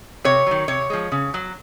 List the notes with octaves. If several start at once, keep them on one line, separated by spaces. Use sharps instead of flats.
C3 C#5
D#3 F#3
C3 C#5
F3 G#3
C#3
F#3